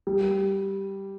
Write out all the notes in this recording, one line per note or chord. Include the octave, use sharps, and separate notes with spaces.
G3